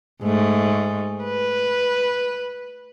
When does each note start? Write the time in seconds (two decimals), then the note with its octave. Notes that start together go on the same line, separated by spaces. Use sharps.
0.22 G#2 A3
1.23 B4